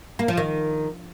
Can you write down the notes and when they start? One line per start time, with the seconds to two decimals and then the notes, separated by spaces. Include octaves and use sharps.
0.19 A#3
0.28 F3
0.37 D#3